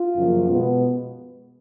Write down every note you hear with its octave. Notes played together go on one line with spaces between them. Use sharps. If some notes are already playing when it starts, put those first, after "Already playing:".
Already playing: F4
F#2 C#3 F3 A#3
B2 G#3 B3